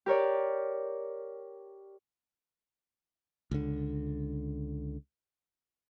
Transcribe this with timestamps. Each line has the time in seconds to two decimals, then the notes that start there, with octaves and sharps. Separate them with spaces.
0.06 G4 A#4 C#5 D5
3.51 C#2 D3